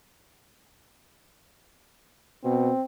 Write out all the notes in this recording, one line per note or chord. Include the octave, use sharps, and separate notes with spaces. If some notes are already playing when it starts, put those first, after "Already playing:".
B2 C4